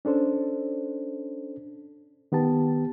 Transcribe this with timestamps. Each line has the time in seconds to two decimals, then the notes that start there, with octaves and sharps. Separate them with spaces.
0.05 C#4 D4 A4 C5
2.32 D#3 B3 G4 A5